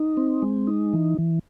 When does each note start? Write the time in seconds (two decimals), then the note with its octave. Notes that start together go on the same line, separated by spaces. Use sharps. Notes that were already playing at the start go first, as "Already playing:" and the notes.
Already playing: D#4
0.17 C4
0.42 G#3
0.67 D#4
0.93 E3
1.18 E3